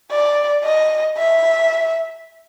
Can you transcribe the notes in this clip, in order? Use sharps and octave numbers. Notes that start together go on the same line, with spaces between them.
D5
D#5
E5